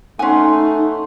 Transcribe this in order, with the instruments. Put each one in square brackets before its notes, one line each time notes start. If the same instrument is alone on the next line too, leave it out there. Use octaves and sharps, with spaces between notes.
[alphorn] A3 [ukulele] C#4 G#5 [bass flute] D#4 [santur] F#5 C6